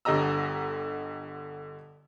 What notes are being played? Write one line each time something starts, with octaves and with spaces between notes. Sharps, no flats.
G1 D3 G4 D#5 A#5 E6